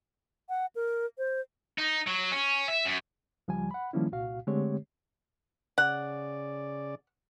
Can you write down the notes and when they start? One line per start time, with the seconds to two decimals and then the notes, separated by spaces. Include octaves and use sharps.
0.49 F#5
0.75 A#4
1.18 C5
1.78 D#4
2.07 F#3
2.31 C#4
2.68 E5
2.86 F#2
3.48 C#2 F3 G3 G#5
3.71 F#5 B5
3.93 D#3 F3 G3 A#3 C#4 E4
4.12 C2 A#2 F#4 F5
4.47 D3 G#3 A3 C4 G4 C#5
5.78 C#3 D5 F#5